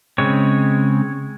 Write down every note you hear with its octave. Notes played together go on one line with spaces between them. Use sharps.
C#3 G#3 C4 C#5